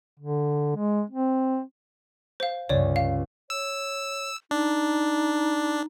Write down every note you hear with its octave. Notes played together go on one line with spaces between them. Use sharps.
D3
G#3
C4
C5 F5
C#2 G2 C#5 D5
F5
C#5 E6
D4 D#4